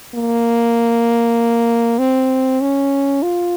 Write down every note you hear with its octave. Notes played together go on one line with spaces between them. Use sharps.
A#3
C4
C#4
F4